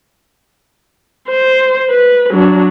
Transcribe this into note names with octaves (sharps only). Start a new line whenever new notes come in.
C5
B4
F#3 D4